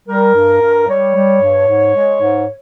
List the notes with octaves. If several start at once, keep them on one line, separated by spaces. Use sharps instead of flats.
G3 A#4
G2
G2
G3 C#5
G3
G2
G#2
G#3
G#2